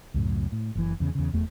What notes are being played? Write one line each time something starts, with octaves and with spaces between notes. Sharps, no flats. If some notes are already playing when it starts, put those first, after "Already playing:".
C#2 F#2 A2
A2
F#1 E3
E2 C#3
E2 C#3
F1 E2 A3